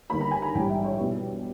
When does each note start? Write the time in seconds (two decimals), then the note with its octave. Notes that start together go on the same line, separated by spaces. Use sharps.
0.10 G1 G2 D#3 A#3 B5
0.21 A#5
0.31 G#5
0.42 A#5
0.55 A#1 G#2 E3 G3 G5
0.70 E5
0.84 C#5
0.99 B2 G3 B3 E4 G4